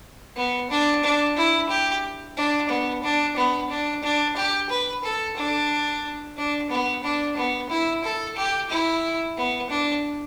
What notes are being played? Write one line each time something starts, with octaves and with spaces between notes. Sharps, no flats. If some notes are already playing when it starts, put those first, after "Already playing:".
B3
D4
D4
E4
G4
D4
B3
D4
B3
D4
D4
G4
B4
A4
D4
D4
B3
D4
B3
E4
A4
G4
E4
B3
D4